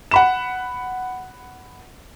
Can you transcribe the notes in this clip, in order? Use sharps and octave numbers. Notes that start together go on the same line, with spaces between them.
F#5 B5 E7